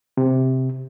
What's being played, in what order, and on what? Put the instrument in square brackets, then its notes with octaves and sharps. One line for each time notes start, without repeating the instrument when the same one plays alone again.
[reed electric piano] C3